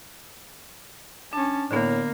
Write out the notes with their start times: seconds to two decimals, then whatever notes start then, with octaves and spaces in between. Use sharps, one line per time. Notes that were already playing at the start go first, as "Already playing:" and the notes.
1.33 C#4 D4 A5
1.71 A2 D3 A#3 B3